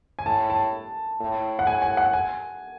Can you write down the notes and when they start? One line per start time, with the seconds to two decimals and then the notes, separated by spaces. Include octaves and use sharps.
0.19 G#5
0.26 A2 A5
0.50 A5
1.20 A2
1.59 F#5
1.66 A2 G#5
1.82 G#5
1.97 F#5
2.13 G#5